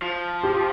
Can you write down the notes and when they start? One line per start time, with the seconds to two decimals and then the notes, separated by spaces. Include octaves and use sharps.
0.02 F3
0.43 G4